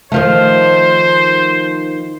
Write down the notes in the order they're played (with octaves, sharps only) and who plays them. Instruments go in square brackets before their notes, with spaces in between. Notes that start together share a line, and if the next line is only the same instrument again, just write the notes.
[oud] D#3 F3 A3 [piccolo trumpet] C5